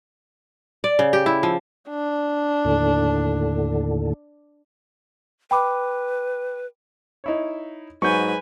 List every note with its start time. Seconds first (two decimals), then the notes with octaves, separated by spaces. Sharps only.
0.84 D5
0.99 C#3
1.13 G4
1.26 E4
1.43 F3
1.89 D4
2.65 D#2 A2 D3
5.51 B4 G5 B5 D6
7.24 D#4 E4 C#5
8.02 G#2 F#3 B4 G#5 C#6 G6